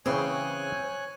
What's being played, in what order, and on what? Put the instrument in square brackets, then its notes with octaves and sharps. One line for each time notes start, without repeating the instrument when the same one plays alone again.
[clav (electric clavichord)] C#3 E3 G#4 [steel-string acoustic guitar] C4 C5 [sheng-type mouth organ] C#5 G#5 F#6